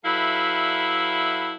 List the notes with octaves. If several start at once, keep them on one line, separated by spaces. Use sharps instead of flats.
F#3 E4 A4 B4 E5 F5